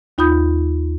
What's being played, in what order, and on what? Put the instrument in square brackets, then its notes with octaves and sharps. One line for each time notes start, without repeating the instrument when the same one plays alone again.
[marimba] D#2 D#4 F4 B5 D#6 G6